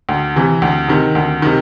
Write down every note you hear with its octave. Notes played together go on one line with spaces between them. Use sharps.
D2
C3 E3
D2
C3 D#3
D2
C3 D#3